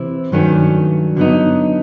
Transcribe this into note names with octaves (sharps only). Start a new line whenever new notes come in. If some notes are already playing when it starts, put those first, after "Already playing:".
Already playing: C3 E3 C4 E4
G2 D#3 F#3 A3 C#4
D3 F#3 B3 D#4